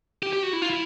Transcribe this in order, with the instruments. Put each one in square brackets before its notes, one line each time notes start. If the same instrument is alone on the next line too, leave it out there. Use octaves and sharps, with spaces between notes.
[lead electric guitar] G4
G4
F#4
E4
F4
E4